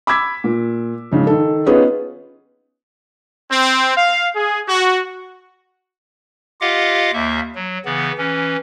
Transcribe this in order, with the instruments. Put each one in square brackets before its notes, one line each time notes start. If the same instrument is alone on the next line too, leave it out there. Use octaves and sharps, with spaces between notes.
[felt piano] B5 D6 E6 G#6 B6
A#2
G#2 C#3 F3
D#3 A4
B3 C#4 D#4 F4 G#4 B4
[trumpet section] C4
F5
G#4
F#4
[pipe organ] F4 G4 D#5 F5 F#5 D6
D#2 A#3 E5
F#3
C#3 E3 B3
E3 C#4